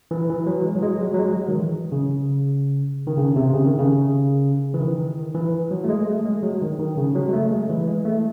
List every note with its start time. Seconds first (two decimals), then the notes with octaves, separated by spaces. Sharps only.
0.11 E3
0.29 E3
0.47 F#3
0.65 G#3
0.76 F#3
0.83 G#3
1.01 F#3
1.14 F#3
1.19 G#3
1.37 F#3
1.49 D#3
1.55 E3
1.92 C#3
3.07 D#3
3.17 C#3
3.36 C3
3.54 C#3
3.66 D#3
3.79 C#3
4.74 E3
4.80 D#3
5.35 E3
5.71 F#3
5.84 A3
5.89 G#3
6.06 A3
6.25 G#3
6.43 F#3
6.61 D#3
6.79 D#3
6.97 C#3
7.15 F#3
7.28 G#3
7.33 A3
7.51 G#3
7.70 E3
7.87 G#3
8.05 A3